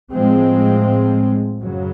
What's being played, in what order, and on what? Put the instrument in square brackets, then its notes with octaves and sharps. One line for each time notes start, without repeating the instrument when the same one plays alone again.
[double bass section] A2 F3 G#3 C4
F#2 C#3 F#3